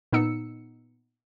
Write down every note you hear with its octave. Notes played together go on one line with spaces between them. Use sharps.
A#2 B3 D#4 E6 C#7